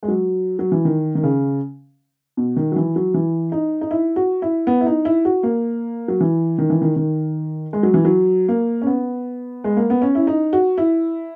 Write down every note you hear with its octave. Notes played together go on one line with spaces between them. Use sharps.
G#3
F#3
F#3
E3
D#3
D#3
C#3
B2
D#3
F#3
E3
F#3
E3
D#4
D#4
E4
F#4
E4
B3
E4
D#4
E4
F#4
A#3
F#3
E3
D#3
E3
D#3
D#3
G#3
F#3
E3
F#3
A#3
C#4
B3
G#3
A#3
B3
C#4
E4
D#4
F#4
E4